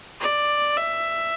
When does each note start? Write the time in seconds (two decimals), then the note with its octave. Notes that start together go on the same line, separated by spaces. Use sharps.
0.20 D5
0.77 E5